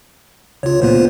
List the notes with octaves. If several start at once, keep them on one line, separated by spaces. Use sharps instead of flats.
C#2 F4 C#5
D2 A#2 B3 F4 C5